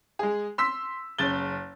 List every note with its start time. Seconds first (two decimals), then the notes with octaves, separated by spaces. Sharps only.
0.19 G#3 G#4
0.58 C6 E6 B6
1.19 F#1 C#3 A6 G7